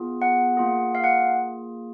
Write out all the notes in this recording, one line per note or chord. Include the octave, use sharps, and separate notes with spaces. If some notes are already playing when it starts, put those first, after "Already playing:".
Already playing: B3 F4 G#4
F#5
A#3 F4 G#4
F5
F#5